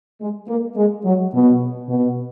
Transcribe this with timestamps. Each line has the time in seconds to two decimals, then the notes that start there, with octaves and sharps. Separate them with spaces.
0.21 G#3
0.48 A#3
0.76 G#3
1.04 F#3
1.33 B2
1.88 B2